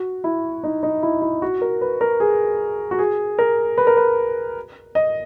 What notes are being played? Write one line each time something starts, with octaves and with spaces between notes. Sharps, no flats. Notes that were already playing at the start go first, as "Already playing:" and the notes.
Already playing: F#4
E4
D#4
D#4
E4
E4
F#4
A#4
B4
A#4
G#4
F#4
G#4
A#4
B4
A#4
B4
D#5